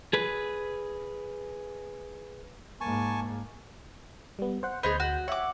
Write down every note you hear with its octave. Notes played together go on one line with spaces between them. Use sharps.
G#4 B4
G#2 A#3 G#5 A5 C#6
G3 B3
C5 F#5
D2 B3 D#4 G#4 C5 G6
F#4
C#5 E5 F#5 D6